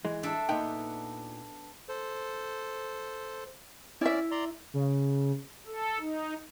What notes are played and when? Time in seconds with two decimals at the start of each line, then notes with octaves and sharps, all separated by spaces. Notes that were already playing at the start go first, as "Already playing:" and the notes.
0.05 E3 G#3
0.23 D4 A4 E5
0.49 A#2 B3 D#4 G5
1.89 A4 C5
4.01 C#4 E4 D5 E5
4.31 D5 A#5 C6
4.74 C#3
5.67 A4
5.99 D#4